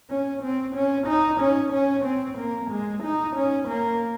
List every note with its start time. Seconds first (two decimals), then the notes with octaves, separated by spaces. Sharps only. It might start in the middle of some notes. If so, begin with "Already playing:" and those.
0.10 C#4
0.43 C4
0.76 C#4
1.08 D#4
1.41 C#4
1.74 C#4
2.05 C4
2.39 A#3
2.71 G#3
3.03 D#4
3.36 C#4
3.69 A#3